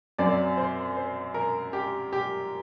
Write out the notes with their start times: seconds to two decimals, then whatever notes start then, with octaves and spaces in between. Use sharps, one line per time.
0.18 F#2 F#3 C4 D5
0.57 C5
0.97 C5
1.34 A#4
1.73 G4
2.13 G4